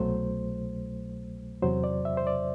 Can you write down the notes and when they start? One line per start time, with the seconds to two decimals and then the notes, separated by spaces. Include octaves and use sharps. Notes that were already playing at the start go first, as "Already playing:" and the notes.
Already playing: C2 B2 F#3 A3 C5
1.62 E2 C3 F#3 C5
1.84 D5
2.05 E5
2.17 C5
2.27 D5